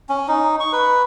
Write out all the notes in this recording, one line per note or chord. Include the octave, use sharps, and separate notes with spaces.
C#4
D#4
C#6
B4